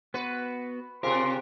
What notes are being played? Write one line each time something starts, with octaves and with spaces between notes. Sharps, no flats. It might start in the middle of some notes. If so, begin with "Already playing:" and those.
B3 F#4 B4
C3 C4 F4 G4 G#4 A#4 C6